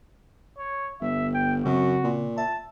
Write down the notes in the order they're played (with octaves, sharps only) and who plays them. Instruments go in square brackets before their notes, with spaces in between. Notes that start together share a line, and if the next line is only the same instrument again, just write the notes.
[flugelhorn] C#5
[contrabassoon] G1 [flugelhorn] E5
[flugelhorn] G5
[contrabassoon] F#2 [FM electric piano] C#3 C4 [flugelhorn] F#4
[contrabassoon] A#2
[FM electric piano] E5 [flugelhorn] A5